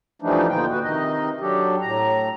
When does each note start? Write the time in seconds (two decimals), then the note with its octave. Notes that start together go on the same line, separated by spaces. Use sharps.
0.22 E3 F3 G3 A3 D4 D#4
0.49 D#2 A#2 D3 B3 D#4 G5
0.70 F#4 B4
0.84 C3 D#3 D#4 D#5
1.40 F#3 D4 G4 A4
1.81 A2 A#5